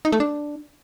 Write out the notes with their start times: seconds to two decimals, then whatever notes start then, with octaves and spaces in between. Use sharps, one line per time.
0.05 D#4
0.12 A3
0.20 D4